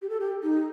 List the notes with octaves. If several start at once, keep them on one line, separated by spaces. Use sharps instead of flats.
G4
A4
G4
D#4